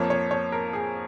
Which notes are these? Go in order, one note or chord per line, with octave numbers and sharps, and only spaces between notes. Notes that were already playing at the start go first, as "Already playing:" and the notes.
Already playing: F2 F3 A#3 C#5
C#5
C#5
A#4
G#4